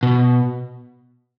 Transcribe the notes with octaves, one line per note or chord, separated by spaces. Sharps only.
B2